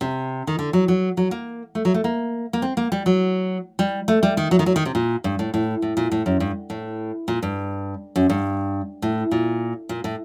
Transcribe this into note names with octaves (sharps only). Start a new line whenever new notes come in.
C3
D#3
D3
F#3
F#3
F#3
A#3
A3
F#3
A3
A#3
A#3
C4
A#3
G3
F#3
G3
A3
G3
D#3
F#3
D#3
F#3
D#3
C3
A#2
G2
A2
A2
A2
A#2
A2
F#2
G2
A2
A#2
G2
F#2
G2
A2
A#2
A#2
A2